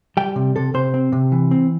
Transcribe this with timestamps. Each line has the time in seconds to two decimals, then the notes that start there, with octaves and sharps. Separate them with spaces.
0.17 G3 G5
0.36 C3
0.56 C3 A4
0.74 C3 C5
0.94 C4
1.12 C3
1.32 E3
1.51 C4